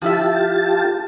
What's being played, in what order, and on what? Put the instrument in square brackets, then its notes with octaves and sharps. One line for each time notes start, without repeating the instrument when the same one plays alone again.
[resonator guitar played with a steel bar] F3 E4 E5 [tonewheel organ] F4 G4 A5